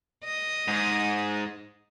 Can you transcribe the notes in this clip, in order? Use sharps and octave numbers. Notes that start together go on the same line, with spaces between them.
D#5
G#2